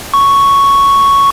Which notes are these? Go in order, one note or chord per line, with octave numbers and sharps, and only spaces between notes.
C#6